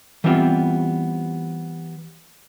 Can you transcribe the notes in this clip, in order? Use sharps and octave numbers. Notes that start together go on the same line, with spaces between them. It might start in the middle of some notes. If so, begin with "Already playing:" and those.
E3 G3 B3 C4 F4